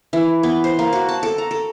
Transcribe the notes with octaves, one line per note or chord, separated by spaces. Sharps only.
E3
B3
C5
A#3
F#4
A5
A4
A#5
A4